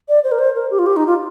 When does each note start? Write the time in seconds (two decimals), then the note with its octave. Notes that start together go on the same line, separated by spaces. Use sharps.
0.09 D5
0.24 C5
0.32 A#4
0.39 C5
0.55 A#4
0.71 G4
0.79 F4
0.86 G4
0.96 D#4
1.07 F4